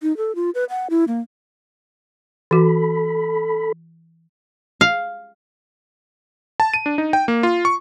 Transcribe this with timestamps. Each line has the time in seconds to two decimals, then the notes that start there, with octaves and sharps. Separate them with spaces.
0.02 D#4
0.17 A4
0.35 F4
0.55 B4
0.70 F#5
0.90 E4
1.08 A#3
2.51 E3 F#4 A4 B5
4.81 F5
6.60 A5
6.74 D#7
6.86 D4
6.98 D#4
7.13 G5
7.28 A#3
7.43 F4
7.65 C#6